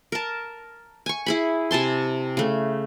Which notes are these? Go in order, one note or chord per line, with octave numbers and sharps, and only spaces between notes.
A#4 A5
G#5 C#6
E4 G#4 B5
C3 G#5 A5 C6
C#3 A3